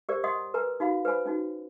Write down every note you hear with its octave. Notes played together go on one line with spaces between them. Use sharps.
G4 A#4 C5 D5
D#5 F#5 C6 D#6
A#4 B4 G#5 A#5
D#4 F#4 F5 B5
B4 C5 G#5 B5
C#4 D#4 F#4